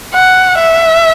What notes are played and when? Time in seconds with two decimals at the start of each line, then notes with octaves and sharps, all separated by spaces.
0.14 F#5
0.59 E5